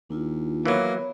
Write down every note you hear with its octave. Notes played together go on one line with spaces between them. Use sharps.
D#2 D4 E4 F4
E3 F#3 A#3 B3 C#5 B5